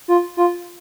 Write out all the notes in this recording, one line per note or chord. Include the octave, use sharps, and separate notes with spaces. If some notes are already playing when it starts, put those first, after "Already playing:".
F4
F4